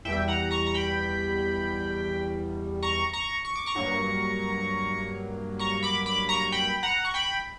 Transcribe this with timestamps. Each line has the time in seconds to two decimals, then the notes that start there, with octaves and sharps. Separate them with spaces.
0.05 E2 B2 G3 E5 G5
0.28 F#5 A#5
0.51 A#5 C#6
0.66 A#5
0.74 G5 B5
2.83 A#5 C#6
3.13 A#5 C#6
3.45 C#6
3.56 D6
3.66 A#5 C#6
3.75 G2 F#3 A#3
5.59 A#5 C#6
5.83 B5 D6
6.06 B5 D6
6.29 A#5 C#6
6.52 G5 B5
6.83 F#5 A#5
7.05 C#6
7.14 G5 B5